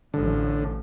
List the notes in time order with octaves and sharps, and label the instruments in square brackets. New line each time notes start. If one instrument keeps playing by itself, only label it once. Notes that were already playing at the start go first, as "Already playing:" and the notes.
[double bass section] A1 A2 F3 [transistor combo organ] D3